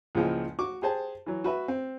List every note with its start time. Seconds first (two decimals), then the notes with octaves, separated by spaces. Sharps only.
0.15 C#2 A#2 E3 F3 G#3
0.59 F#4 C#6 D6
0.82 G4 G#4 C5 A5
1.26 E3 F#3
1.44 F#4 B4 E5
1.68 C4